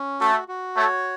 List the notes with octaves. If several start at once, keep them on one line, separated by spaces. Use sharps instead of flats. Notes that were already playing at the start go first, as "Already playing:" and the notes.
Already playing: C#4
A3 F#4
F#4
A3 C#5